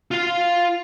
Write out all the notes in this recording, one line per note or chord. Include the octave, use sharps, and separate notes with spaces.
F4 F5